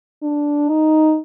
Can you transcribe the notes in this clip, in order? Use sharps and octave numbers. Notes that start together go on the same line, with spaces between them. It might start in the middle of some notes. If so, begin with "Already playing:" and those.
D4
D#4